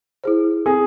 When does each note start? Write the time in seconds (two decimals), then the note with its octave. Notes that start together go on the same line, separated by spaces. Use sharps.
0.24 E4 G#4 C5
0.66 C4 G#4